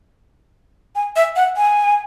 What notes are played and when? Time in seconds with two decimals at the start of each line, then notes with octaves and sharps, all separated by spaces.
0.95 G#5
1.16 E5
1.36 F#5
1.57 G#5